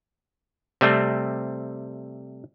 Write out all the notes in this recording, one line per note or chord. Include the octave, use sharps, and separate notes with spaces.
C3 G3 A3 C4